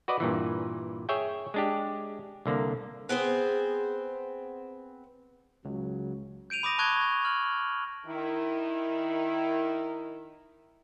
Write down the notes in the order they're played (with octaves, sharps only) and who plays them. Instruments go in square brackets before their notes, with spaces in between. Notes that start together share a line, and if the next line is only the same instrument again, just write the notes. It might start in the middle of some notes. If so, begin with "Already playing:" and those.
[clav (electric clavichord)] F#4 B4 D5 D#5
G2 A#2 E3
G#4 C#5 E5 G5
G#3 D4 G4
C2 D3 A#3
[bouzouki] B3 C4 G#4 C5
[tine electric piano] C#2 [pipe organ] C#3 F#3
[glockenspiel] G6 D7 D#7 F7
B5 D6 D#6 A#6 D#7
A5 C#6 F#6 G#6 D#7 G7
G#6
F6 F#7
[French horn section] D#3 E4